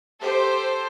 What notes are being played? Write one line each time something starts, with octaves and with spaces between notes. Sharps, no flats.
G4 A4 C5